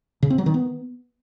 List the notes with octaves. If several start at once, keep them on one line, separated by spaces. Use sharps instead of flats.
C#3
C4
F#3
D#3
B3